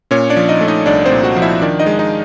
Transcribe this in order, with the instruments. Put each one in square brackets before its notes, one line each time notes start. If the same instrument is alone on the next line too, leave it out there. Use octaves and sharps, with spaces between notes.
[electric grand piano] A#2 C#4 C#5
D4 D5
F3
D#4 D#5
A3
D#4 D#5
C2 D4 D5
C4 C5
A#2
F#4 F#5
F3
E4 E5
D#3 D4 D5
D#4 D#5
G#3
D#4 D#5